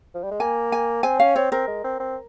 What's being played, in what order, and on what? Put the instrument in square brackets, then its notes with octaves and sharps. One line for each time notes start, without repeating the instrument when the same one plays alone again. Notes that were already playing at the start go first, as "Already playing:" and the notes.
[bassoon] F3
G3
G#3
[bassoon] A#3 [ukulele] G#5
[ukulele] G#5
[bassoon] C4 [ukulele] G#5
[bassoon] C#4 [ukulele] F5
[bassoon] C4 [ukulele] C#5
[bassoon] C4 [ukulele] A#4
[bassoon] G#3
C4
C4